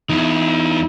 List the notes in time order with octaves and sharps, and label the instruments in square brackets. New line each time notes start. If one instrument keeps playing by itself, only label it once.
[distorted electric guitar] E2 [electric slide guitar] D#4 E4